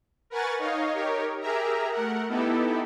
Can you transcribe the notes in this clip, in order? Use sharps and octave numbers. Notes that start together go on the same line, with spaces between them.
A#4 B4 F#5 G#5 C#6 A6
D#4 C#5 D#5 F5
D#4 G4 A#4 C#5
G4 G#4 A#4 E5 A#5
A3 A#4 F#5
B3 D#4 E4 G4 A4